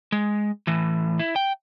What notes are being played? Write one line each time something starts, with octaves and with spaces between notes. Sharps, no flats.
G#3
A2 E3
E4
G5